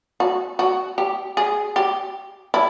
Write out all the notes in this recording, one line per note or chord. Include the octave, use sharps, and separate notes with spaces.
F#4
F#4
G4
G#4
G4
E4